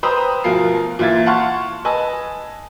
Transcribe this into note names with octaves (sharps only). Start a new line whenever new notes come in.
B4 C5 G5 A#5 D#6 E6
D2 B2 F3 F4 A#4 C7
A#2 E3 F4 E5 G#6 A6
F5 F#5 A5 C6 C#6 F6
B4 D#5 G#5 A5 E6